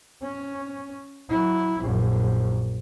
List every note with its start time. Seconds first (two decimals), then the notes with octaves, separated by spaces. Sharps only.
0.23 C#4
1.29 F#3 E4
1.81 A#1 F#2